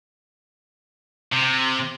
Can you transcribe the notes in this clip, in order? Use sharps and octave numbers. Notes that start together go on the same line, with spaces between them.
C3